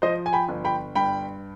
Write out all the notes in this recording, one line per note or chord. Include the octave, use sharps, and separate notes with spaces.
F3 C5 D#5
G#5
G5 B5
G1
G5 B5
G2 G5 B5